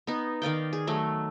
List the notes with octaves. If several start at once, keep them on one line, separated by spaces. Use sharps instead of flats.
B3 D#4
D#3 D5 F5 G5
G#4
D#3 F#3 A3